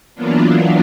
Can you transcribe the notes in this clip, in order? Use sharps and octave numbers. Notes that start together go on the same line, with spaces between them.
E3 F#3 A#3 B3 D4 F4